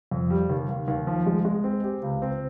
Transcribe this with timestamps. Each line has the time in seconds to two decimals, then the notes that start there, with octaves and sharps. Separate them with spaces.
0.11 F2
0.30 G3
0.50 D#2
0.69 D#2
0.88 D#2
1.07 F3
1.26 G#3
1.45 G#3
1.64 C4
1.84 G4
2.03 C#2
2.22 C4